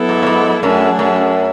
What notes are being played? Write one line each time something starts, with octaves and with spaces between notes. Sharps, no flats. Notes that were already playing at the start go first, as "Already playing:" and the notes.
Already playing: F#3 B3 E4 A4
G#2
A2
G#2
F#2 F#3 A3 D4 G#4
F#2